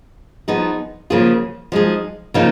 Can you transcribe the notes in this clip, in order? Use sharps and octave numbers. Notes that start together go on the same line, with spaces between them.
F3 B3 D#4 G#4
C#3 F3 A#3 F4 G#4
F3 G#3 D#4 G#4
C#3 F3 A#3 D#4